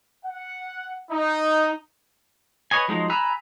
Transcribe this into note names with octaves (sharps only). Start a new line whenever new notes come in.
F#5
D#4
B4 C#5 D#5 G#5
F3 F#3 G#3 D#4
G#5 A#5 B5 E6 F#6